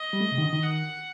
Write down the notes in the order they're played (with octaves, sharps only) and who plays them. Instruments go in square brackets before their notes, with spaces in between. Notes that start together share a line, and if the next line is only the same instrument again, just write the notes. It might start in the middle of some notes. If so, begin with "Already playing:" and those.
Already playing: [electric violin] D#5
[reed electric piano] G3
A3
C3
D#3
D3
D#3
[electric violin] F#5